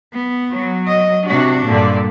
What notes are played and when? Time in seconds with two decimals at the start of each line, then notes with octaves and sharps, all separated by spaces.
0.13 B3
0.51 F#3
0.88 D#5
1.27 C3 D4 F#4
1.67 G2 A#2 D3 D5